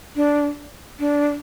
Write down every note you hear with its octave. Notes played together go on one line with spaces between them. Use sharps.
D4
D4